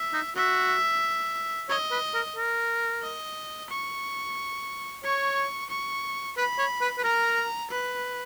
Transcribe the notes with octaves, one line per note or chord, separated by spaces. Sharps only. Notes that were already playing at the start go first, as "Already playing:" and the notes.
Already playing: E5
D#4
F#4 E5
C#5 D#5
B4
A#4
A#4
D#5
C#6
C#5 C#6
C#6
B4 B5
C#5
B4
B4
A#4 A#5
B4